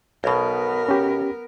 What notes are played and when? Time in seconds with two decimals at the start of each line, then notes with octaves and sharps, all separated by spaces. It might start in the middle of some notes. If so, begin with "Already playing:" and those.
0.24 B1 B2 B3 A#4
0.89 C#4 G4